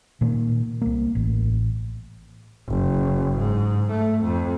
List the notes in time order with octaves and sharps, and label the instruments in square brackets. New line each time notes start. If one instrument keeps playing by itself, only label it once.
[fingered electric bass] A#2 D#3 A#3
C2 A#3
A1
[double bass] F#1
G#2
A3
F2